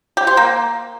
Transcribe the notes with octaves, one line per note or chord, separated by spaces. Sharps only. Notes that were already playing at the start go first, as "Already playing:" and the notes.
G4
C5
A#3